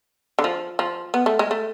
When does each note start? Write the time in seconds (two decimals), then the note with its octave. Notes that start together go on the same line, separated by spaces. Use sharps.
0.39 D3
0.44 F3
0.79 F3
1.14 B3
1.26 A3
1.39 G#3
1.51 A3